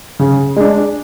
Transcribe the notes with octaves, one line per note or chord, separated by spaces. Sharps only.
C#3
G#3 D4